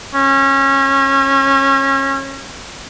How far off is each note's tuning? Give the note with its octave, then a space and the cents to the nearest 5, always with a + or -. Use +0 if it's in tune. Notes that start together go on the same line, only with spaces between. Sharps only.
C#4 -25